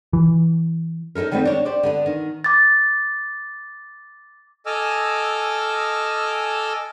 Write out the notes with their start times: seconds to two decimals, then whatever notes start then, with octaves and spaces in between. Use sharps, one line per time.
0.13 E3
1.15 C#4 D#4 E4 A4 A#4
1.32 D#3 G3 A3 B3 C4
1.45 D4 C#5
1.65 G4 C5 D5
1.83 D3 B3 D4
2.06 D#3
2.44 D6 A6
4.66 A4 D#5 G#5 D6 E6 F6